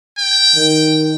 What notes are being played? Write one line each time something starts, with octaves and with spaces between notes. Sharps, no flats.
G5
D#3